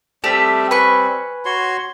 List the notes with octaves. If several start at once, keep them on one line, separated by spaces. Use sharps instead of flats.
G3 A3 C4 G4 E5
B4 G#5 C#6
F#4 C#5 C6